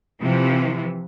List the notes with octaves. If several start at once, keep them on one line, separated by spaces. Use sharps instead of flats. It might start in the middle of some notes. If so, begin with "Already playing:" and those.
C3 E3 F3